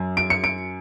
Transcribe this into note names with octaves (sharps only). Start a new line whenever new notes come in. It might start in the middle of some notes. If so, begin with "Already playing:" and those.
Already playing: F#2
D7
C#7
D7